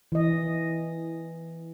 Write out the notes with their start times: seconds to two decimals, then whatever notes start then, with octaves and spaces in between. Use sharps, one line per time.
0.12 E3 D#5